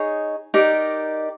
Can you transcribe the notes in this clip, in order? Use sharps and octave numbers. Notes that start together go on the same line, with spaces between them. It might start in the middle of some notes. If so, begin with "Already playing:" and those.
Already playing: D#4 G#4 C#5
D#4 G4 A#4 D5